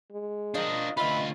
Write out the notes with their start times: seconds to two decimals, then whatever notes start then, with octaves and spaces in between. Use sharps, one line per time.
0.11 G#3
0.54 D4 F4 A#4 C5 D#5
0.97 D2 F4 B4 D#5 E5 B5